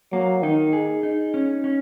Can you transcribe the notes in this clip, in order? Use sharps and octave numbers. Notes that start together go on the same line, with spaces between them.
F#3 A#3
D#3 D#4
G#4
D#4
C#4
C#4